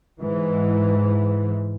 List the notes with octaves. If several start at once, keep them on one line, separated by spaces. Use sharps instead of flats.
G#2 E3